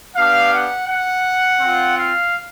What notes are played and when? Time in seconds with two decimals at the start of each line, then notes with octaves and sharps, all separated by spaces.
0.15 B3 D4 G4 F5
0.52 F#5
0.88 F#5
1.59 C4 F4
1.96 F5